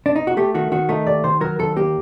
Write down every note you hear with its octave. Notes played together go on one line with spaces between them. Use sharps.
D4
D#4
F#4
A3 G4
D#3 F#4
D#3 F#4
A3 D#4
D#2 D5
D#3 C5
F#3 A#4
D#2 A4
A#3 G4